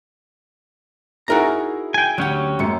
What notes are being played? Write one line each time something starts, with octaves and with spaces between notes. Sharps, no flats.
D#4 E4 F#4 G#4 A#4 A#5
G5 G#5
D2 F#3 C#4 G4 F#5
F#1 F#2 G#3 C#7